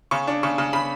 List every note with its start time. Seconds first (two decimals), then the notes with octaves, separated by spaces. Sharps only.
0.11 C#3 C#6
0.27 D4
0.43 C#3 C#6
0.58 C#3
0.73 C#3 B5